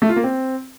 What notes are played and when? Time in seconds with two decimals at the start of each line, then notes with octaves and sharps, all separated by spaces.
0.02 A3
0.09 F4
0.16 A#3
0.24 C4